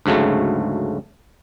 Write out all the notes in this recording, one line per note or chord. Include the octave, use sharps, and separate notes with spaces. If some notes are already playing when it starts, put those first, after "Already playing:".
D2 G#2 C#3 F#3 A3